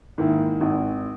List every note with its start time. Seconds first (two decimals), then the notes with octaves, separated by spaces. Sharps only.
0.18 G#2 D#3 A#3 E4
0.61 G#1